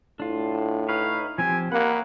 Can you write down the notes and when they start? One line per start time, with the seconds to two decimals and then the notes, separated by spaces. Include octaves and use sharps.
0.20 A2 D4 F4
0.89 D#4 B4 C#5 F5
1.38 F3 C4 G4 G#5
1.72 A#3 F#5 B5